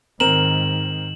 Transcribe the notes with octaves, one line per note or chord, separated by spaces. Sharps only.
G#2 D#3 C4 A#4 E7 F#7